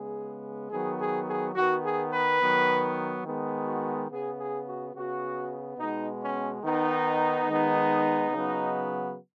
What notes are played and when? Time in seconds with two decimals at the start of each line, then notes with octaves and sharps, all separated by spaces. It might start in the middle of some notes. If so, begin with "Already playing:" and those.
Already playing: C#3 G#3 B3 G#4
0.70 D#3 F#3 B3 G#4
0.99 G#4
1.26 G#4
1.55 D#3 B3 F#4
1.83 G#4
2.11 B4
2.40 D#3 F#3 B3
3.25 D#3 G#3 B3
3.66 F#4
4.09 C#3 B3 G#4
4.38 G#4
4.66 F#4
4.94 C#3 B3 F#4
5.78 B2 G#3 B3 D#4
6.21 C#4
6.62 D#3 B3 D#4
7.47 D#3 G#3 B3
8.32 C#3 F#3 B3